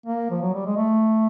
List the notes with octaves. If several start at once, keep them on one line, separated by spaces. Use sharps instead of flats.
A#3
F3
F#3
G3
G#3
A3